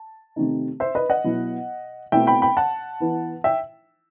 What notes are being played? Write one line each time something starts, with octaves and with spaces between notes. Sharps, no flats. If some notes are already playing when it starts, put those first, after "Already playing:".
Already playing: A5
C3 D#3 A3 C4 D#4
C5 E5
B4 D#5
D#5 F#5
B2 F#3 B3 E4
B2 A3 C4 E4 E5 G5
G5 B5
G5 B5
F#5 A5
E3 B3 E4
E5 G5